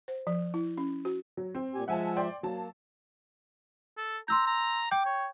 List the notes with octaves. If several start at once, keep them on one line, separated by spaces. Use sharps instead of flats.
C5
F3
E4
C#4
F#4
F#3
C4
A#2 G4 G#5
F3 G#3 E5 F#5 G#5 A5
D5 G5 C6
F#3 A#3 A5
A4
A#5 C6 E6 G6
A#5
G5 D6 G6
C#5